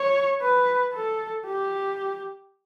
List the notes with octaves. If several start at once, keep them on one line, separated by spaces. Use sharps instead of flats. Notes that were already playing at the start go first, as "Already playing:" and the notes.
Already playing: C#5
B4
A4
G4